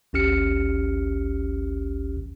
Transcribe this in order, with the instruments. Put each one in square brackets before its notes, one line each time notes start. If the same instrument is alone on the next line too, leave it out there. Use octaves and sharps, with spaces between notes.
[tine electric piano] G#1 D2 C#4 G4 F6 C#7